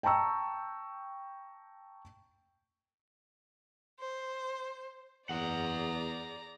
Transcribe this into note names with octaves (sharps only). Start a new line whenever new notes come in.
G5 A5 A#5 C#6 E6
C5
E2 G#4 D5 F#5 A#5